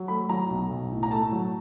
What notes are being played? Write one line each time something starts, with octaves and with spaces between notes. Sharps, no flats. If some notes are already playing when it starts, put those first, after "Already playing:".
Already playing: F#3
A3 B5
F#3 A#5
B1
B1
A2
A#5
A3 A5
F#3